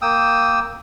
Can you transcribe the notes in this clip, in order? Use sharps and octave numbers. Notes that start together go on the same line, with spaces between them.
A#3 G5 D#6 E6